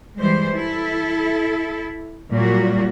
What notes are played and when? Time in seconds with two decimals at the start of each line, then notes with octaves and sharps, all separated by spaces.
0.18 E3 G3 G#3 C5
0.54 E4 A4
2.33 A#2 F#3 G3 A#3 F#4